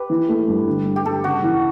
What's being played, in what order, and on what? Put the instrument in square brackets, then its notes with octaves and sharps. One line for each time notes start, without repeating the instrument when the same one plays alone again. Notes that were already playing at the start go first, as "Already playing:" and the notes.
Already playing: [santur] G4 B4
[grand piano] E3
A3
G2
D3
G3
[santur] G4
[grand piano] G2 [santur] A4
[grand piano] C#3 [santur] F#4
[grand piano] E3